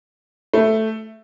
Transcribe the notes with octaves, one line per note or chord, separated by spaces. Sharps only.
A3